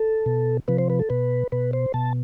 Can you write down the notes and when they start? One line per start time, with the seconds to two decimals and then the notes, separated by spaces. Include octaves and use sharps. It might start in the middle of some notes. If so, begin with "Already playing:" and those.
Already playing: A4
0.26 B2
0.68 C3 F3 B4
0.78 C5
0.90 B4
0.99 A4
1.10 B2 B4
1.52 B2 B4
1.73 C5
1.94 B2 A5